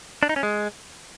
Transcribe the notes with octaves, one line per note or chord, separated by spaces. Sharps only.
D4
D#4
C#4
G#3